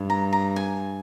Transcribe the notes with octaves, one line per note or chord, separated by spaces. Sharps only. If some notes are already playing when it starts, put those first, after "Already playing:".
Already playing: G2
A#5
A#5
G#5